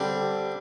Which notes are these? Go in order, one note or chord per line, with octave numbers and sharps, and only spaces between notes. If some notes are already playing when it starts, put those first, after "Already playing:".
Already playing: D3 G3 C4